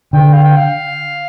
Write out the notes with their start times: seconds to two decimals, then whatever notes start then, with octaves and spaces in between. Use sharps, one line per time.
0.13 D3 G5
0.33 F5
0.44 G5
0.56 F5